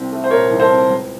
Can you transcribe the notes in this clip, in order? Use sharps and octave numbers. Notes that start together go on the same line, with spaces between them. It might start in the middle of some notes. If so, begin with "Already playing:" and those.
Already playing: C2 C4
A3
C5
A#2 A#4 C#5
C2
A4 C5
C4
C#2